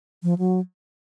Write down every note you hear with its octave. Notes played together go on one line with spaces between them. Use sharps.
F3
F#3